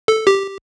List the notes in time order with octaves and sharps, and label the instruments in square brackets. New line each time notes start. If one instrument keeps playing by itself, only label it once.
[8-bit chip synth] A4
G4